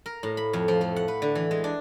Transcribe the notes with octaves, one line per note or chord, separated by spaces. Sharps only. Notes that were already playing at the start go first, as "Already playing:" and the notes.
A#4
A2
B5
F2
F3
A3
F#5
B4
D3
E3
G#3
D4